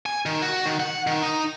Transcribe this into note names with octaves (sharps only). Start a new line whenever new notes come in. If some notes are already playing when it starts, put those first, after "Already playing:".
G#5
D#3
F#4
D#3
F#5
D#3
D#4